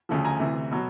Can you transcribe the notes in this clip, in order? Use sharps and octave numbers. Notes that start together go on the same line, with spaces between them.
D2 C#3 F3
G#5 A#5
D2 C3 E3
B2 F#3